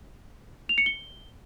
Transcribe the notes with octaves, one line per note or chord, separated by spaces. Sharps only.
F7
C#7
G7